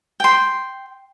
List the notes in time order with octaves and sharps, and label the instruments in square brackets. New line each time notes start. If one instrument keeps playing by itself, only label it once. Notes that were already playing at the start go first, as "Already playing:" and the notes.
[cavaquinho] G5 C6